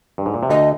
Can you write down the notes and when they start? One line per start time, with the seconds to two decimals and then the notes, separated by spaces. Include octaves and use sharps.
0.18 G2
0.26 G#2
0.34 A#2
0.43 C3
0.49 D2 D3 D#5